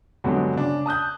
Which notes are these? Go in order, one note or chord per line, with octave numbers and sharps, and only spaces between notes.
G2 B2 D3 F#3 G#3
C#3 D4
A5 D#6 F#6 G6